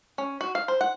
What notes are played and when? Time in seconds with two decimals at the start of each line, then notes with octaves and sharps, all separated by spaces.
0.18 C#4
0.41 F#4
0.55 F5
0.68 C5
0.81 F#5